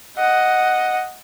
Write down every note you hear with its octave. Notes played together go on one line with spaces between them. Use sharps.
D#5 F#5